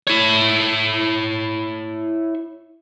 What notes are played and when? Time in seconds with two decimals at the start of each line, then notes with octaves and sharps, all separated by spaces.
0.07 E4 C#5